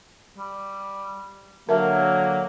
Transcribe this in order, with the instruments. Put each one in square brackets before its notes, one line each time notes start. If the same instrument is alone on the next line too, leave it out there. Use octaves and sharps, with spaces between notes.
[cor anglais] G3
[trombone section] D3 F#3 [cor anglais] A#3 [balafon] A#4 E5 A5